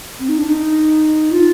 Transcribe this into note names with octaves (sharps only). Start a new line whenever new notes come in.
C4
D#4
D4
D#4
F4